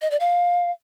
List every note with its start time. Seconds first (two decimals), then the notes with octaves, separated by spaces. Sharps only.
0.02 D#5
0.11 D5
0.20 F5